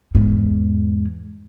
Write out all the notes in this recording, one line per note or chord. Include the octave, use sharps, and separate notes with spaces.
E2 G#2